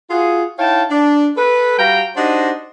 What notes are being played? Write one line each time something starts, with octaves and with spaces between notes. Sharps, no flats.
F4 F#4 G#4
D#4 E4 C#5 F5 G5 A5
D4
A4 B4
G3 F#4 F5 G5 A#5
D4 D#4 F#4 G4 C5 D#5